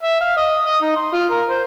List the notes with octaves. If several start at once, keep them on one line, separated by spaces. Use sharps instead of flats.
E5
F5
D#5
D#5
D#4
C6
F4
A#4
C5